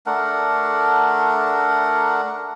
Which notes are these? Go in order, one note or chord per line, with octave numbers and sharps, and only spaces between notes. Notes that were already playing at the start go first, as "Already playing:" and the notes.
A3 D4 A#4 F#5